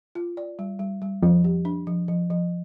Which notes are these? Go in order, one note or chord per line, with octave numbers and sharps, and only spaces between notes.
F4
D5
G3
G3
G3
F2 F3
G4
D4
F3
F3
F3